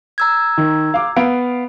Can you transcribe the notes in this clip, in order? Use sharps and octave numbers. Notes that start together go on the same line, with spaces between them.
A#5 E6 G#6
D#3
F5 D6
B3 F5 D7